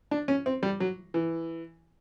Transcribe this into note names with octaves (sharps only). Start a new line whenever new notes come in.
D4
C#4
C4
G3
F#3
E3